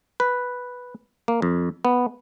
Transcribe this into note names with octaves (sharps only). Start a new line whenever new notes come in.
B4
A#3
F2
B3